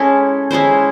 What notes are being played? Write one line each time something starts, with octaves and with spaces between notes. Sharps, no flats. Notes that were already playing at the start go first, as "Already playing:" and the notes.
Already playing: G#3 C#4 E4 A4
G#3 C#4 E4 C5